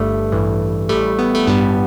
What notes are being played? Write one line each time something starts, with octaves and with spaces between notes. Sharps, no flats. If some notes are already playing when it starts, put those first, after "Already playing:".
Already playing: G1 G2 G3 A3
A1 G2 E3
A1 A2 G3 A3
B3
A3
A1 G2 G3 B3